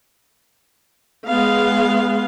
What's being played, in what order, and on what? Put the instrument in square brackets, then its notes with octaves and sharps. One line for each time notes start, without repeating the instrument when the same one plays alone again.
[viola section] G#3 B3 F5